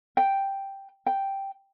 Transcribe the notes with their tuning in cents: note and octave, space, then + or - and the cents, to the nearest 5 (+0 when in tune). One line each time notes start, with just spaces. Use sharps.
G5 +0
G5 +0